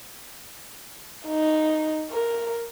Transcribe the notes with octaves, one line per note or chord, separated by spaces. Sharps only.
D#4
A#4